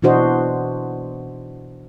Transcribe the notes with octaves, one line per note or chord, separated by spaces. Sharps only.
B2 E3 D4 F#4 C5 D#5